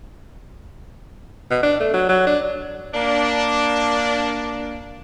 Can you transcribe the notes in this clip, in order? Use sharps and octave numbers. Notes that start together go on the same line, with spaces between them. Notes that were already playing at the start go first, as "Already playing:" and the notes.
B2
D4
A3
F#3
F#3
D4
A#3 D4